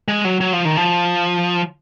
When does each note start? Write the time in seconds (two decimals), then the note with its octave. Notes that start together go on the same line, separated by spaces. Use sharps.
0.08 G#3
0.25 F#3
0.41 F#3
0.53 F3
0.65 D#3
0.77 F3